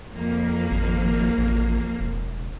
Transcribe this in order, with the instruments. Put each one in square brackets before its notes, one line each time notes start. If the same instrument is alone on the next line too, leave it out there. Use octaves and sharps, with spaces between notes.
[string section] F2 A#3
[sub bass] G#1
A1
E1